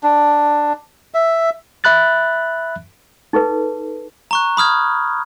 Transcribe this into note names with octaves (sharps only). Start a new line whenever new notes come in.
D4
E5
E5 B5 F#6 A6
D#4 G#4 A4 B4
A#5 C#6 F#6
B5 D#6 F6 G#6